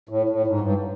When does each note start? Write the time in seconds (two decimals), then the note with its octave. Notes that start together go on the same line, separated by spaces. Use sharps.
0.09 A2
0.29 A2
0.47 G#2
0.61 G2